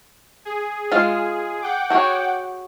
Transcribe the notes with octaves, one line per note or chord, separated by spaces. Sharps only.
G#4
G#3 F4 F5
F#5 G5 D6
F#4 G#4 C#5